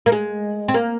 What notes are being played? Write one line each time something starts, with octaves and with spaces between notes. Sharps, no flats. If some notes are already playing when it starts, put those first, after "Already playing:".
A#3
G#3
C4
A#3